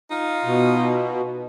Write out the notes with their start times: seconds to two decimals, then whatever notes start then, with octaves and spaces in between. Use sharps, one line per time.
0.11 D#4 F4
0.45 B2